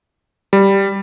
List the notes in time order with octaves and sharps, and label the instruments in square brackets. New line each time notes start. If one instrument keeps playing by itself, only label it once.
[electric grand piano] G3